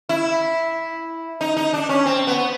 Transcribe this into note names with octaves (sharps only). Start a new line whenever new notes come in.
E4
D#4
D#4
D4
C#4
C4
B3